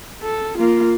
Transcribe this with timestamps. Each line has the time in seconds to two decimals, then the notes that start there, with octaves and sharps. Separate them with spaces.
0.23 A4
0.58 A#3 F4